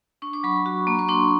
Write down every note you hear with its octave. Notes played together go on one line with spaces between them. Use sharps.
D4 C#6
D6
F#3 B5 C#6
F#4
A#3
C#6
D4 C6 D6